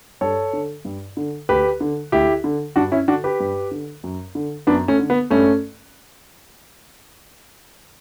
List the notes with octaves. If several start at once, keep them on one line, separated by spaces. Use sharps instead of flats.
G2 A4 C#5
D3
G2
D3
D2 G4 B4
D3
D2 E4 G4
D3
G2 D4 F#4
C#4 E4
D3 D4 F#4
G4 B4
G2
D3
F#2
D3
F#2 B3 D4
A3 C#4
D3
B3
G2 A3 C#4